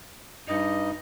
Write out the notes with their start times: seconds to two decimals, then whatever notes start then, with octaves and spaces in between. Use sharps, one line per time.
0.48 G2 D#4 D#5